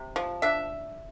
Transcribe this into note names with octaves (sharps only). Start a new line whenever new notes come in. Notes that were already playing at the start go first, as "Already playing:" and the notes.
Already playing: C3
F3
D4 E5